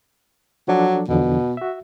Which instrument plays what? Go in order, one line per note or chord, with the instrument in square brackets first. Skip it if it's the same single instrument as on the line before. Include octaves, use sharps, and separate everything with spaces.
[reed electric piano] F3 D4 A4 [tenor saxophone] F#3
[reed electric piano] E2 D3 F3 [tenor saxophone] B2
[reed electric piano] F#4 E5